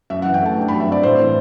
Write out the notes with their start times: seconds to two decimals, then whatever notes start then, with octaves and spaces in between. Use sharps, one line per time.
0.10 F#2 E5
0.22 F#5
0.26 E3
0.34 G5
0.42 A3 A5
0.57 G2
0.68 B5
0.72 F#3
0.80 E5
0.88 C4 D5
1.03 A2 C5
1.19 E3